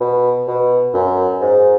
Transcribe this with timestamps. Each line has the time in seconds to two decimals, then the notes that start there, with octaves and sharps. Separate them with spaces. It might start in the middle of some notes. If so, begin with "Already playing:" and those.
0.01 B2
0.48 B2
0.94 F#2
1.41 G#2